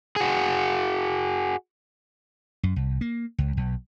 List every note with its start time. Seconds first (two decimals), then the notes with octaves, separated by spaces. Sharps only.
0.16 F#4 G#4
2.63 F#2
2.76 C2
3.01 A#3
3.38 C#2
3.57 B1